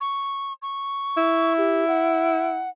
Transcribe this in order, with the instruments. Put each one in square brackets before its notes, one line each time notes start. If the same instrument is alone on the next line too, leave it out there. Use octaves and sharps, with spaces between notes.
[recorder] C#6
C#6
[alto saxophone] E4
[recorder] G4
F#5